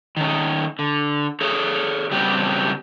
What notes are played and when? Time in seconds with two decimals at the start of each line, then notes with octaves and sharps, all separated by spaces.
0.17 D#3 C#4
0.79 D3
1.41 G#4 A4 C#5
2.11 C#3 F#3 G3 B3 C4 G4